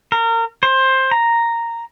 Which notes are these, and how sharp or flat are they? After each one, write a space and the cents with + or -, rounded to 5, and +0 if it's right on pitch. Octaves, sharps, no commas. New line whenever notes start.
A#4 -30
C5 +15
A#5 -5